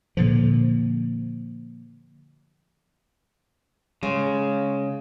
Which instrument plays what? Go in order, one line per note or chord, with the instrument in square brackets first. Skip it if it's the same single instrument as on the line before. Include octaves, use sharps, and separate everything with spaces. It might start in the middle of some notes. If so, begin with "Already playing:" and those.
[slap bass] A#2 D3 F3
[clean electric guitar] C#3 [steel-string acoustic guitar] G#3